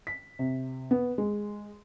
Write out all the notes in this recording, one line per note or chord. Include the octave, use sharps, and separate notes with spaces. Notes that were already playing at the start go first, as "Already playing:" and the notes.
B6
C3
B3
G#3